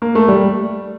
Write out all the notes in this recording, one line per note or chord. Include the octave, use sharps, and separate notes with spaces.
A#3
A3
G3